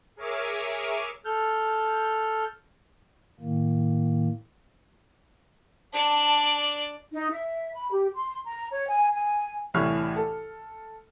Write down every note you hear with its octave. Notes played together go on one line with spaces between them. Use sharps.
G#4 A#4 C#5 E5 D6 F6
A4 F6 G6
A2 D#3 A#3
D4 D5 A5
D#4
E5
B5
G4
C6
A#5
C#5
G#5
G#5
C2 A2 E3 C#5 F6
A4